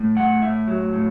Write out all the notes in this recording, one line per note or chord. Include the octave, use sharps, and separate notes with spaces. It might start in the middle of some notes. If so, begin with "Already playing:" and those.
Already playing: A2
A3 F#5
A2 E5
F#3
A2